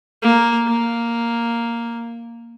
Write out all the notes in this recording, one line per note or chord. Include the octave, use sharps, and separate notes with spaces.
A#3
A#3